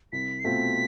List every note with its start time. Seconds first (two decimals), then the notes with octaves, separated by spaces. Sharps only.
0.12 C2 B6
0.40 C7
0.44 B2 A3 C4 F4 B6